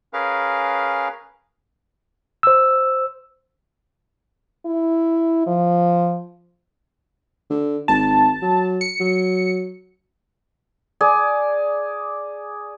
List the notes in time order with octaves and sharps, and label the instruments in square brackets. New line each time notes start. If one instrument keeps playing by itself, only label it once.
[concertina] C#4 G#4 A#4 B4 F5
[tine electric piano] C5 E6
[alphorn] E4
F3
[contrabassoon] D3
[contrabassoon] G#1 [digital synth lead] A5
[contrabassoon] F#3
[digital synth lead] C#7
[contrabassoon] F#3
[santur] G#4 D5